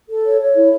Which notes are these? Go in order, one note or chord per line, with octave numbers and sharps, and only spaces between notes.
A4
C#5
C#5
E4